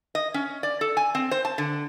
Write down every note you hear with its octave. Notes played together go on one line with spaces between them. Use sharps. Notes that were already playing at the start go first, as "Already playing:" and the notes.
D#5
C#4
D5
A4
G#5
C4
C5
A5
D3